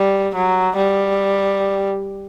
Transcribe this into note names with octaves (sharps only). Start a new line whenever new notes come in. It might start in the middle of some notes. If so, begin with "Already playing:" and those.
Already playing: G3
F#3
G3